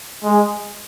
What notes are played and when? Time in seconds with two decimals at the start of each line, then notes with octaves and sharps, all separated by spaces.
0.23 G#3